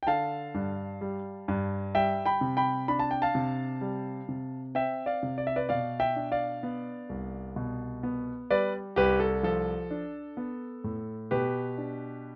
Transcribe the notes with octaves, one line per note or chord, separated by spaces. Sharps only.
G5
D3 F5 A5
G2
G3
G2
G3 E5 G5
G5 B5
C3
G5 B5
D4 B5
A5
G5
F5 A5
C3
G3
C3
C4 E5 G5
D5 F5
C3
D5
E5
B4 D5
B2 D5 F5
E5 G5
D4
D5 F5
B3
C2
B2
B3
G3 B4 D5
C2 G4 B4
A4
F3 A4
D4
B3
A2
B2 G4 B4
D4